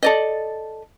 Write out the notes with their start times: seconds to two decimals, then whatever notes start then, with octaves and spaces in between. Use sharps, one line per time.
0.03 A4 D5 D#5